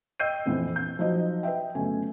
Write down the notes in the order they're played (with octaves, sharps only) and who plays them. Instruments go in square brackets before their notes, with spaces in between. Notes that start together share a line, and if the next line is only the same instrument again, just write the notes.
[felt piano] D#5 G5 E6 G6 C7 D#7
A#1 F2 E3 C4
G6
F3 F#3 D#4 F#4 C5 D#5
B4 D#5 E5 G5
G1 C#3 F#3 A3 G#5